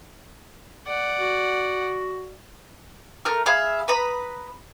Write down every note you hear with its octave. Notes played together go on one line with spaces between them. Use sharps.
D5 F#5
F#4
A3 A#4 F6
G#4 E5 F5 B5
B4 A#5 B5 D#6